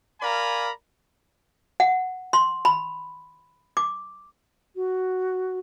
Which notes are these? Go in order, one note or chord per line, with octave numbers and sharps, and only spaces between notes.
A#4 D5 F5 G#5 A#5 B5
F#5
C6
B5
D6
F#4